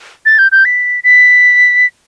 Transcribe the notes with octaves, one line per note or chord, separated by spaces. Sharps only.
A6
G6
G6
B6
B6